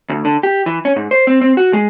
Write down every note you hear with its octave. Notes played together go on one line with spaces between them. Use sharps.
D2
D3
G4
E3
C#4
G#2
C5
C4
C4
F#4
G#3